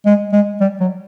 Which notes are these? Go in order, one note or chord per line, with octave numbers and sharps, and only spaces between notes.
G#3
G#3
G3
F#3